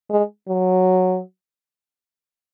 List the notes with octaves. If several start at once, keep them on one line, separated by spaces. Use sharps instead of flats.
G#3
F#3